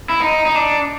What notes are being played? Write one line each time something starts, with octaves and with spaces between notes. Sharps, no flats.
E4
D#4
D#4
D4